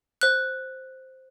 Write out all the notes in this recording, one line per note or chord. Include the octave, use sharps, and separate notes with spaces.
C5 F#6